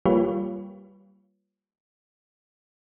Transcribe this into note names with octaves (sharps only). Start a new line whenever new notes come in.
G3 A#3 F4 G4 B4 C#5